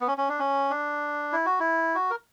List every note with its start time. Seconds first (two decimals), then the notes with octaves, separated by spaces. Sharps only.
0.01 B3
0.08 C#4
0.18 C#4
0.29 D4
0.39 C#4
0.70 D4
1.32 E4
1.46 F#4
1.59 E4
1.95 F#4
2.10 A#4